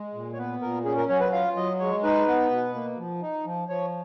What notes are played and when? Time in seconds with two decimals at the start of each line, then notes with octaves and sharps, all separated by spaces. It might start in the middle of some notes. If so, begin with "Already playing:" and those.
Already playing: G#3
0.14 A#2
0.33 C#5
0.38 B3 B4
0.62 A#2 A#4
0.85 C#4 G#4
0.97 A#4
1.09 F#3 C#5
1.20 B4
1.32 F4 F5
1.56 F#3 D#5
1.79 G#3 C#5
2.03 D#4 B4
2.28 B3
2.51 B2
2.75 A#3
2.98 F3
3.22 D#4
3.45 F3
3.68 F3 C#5